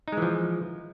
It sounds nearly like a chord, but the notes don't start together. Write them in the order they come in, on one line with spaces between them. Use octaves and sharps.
D#4 G#3 E3 F3